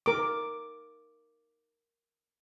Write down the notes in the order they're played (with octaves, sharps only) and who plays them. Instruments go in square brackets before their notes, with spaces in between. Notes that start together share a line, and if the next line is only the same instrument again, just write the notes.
[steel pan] A#4 D6